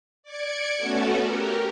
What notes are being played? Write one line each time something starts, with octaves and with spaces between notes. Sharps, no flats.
D5 D6 G#6 C#7
A3 B3 C#4 F#4 A4
G4 A#4